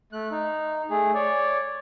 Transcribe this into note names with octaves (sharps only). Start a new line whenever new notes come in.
A3 F#6
D#4
A3 G#4
C#5 D5